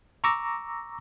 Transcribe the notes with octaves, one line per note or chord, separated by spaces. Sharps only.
A#5 C#6 D6 E6 A#6